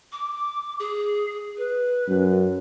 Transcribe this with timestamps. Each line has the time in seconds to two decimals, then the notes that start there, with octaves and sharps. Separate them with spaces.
0.12 D6
0.80 G#4
1.57 B4
2.08 F#2